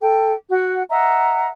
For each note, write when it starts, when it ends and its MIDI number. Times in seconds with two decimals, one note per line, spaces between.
0.01 0.32 69
0.01 0.32 79
0.52 0.82 66
0.52 0.82 78
0.90 1.47 75
0.90 1.47 76
0.90 1.47 78
0.90 1.47 82